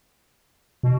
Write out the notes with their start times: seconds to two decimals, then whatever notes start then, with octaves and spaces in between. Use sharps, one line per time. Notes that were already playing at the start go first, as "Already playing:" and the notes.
0.83 B2